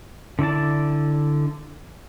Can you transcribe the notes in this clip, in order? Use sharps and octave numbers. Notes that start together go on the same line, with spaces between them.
D3 E4 D5 A5